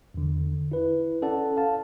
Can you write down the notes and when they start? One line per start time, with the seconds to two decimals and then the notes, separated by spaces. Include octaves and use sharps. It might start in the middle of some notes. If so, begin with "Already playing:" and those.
0.14 E2 D3
0.72 E4 B4
1.22 C#4 A4 D5 F#5 A5
1.57 F5 A5